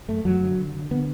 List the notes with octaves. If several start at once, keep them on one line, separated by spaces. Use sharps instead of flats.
F#2 A3
F#2 F#3
D3
D3
D3
D3 B3